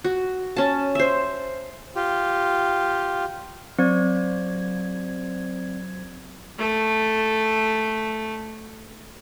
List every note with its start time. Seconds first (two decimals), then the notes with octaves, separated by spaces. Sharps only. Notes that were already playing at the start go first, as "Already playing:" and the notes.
0.04 F#4
0.56 C#4 A5
0.95 C5 E5
1.96 F4 G4
3.79 F#3 C4 C5 D5 G#6
6.58 A3 A4